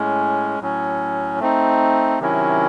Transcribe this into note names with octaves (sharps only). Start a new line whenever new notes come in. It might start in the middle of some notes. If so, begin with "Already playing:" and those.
Already playing: A2 G#3 C#4
A2 F#3 C#4
A3 C4 D#4
C3 D#3 F#3 C#4 E4